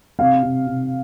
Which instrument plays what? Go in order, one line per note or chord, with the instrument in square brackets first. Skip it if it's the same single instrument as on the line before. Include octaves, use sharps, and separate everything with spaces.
[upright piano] C3 F5
C3
C3